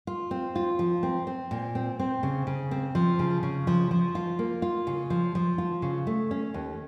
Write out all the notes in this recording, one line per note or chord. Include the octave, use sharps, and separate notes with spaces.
F4
C4
F4
F3
C4
C4
A#2
C4
C4
C#3
C#3
C4
F3
C#3
C#3
F3
F3
F4
A#3
F4
C#3
F3
F3
F4
C#3
A3
C#4
D#2